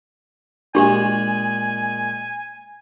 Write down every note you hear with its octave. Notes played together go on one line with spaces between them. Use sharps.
A#2 G#3 D4 G4 G#5